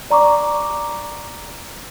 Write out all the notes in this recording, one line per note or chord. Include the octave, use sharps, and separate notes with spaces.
D5 A#5 C#6 D6